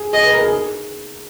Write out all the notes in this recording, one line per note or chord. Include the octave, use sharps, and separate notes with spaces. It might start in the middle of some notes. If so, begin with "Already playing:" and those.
Already playing: G#4
G#4 D#5
B4
A#4
G#4
G#4